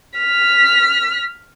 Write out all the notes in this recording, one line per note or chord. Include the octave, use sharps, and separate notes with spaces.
F6 B6